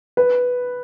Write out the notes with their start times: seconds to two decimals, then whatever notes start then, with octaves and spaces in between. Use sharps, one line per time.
0.17 B4